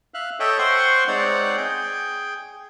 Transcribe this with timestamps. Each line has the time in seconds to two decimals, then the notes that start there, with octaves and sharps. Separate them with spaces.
0.14 E5 F5 F#6
0.40 A4 C#5 D#5 E5 G5
0.59 C5 F#5 G5 C6 C#6
1.08 G#3 C4 D#4 C#5 D5 F#5
1.57 G#4 G5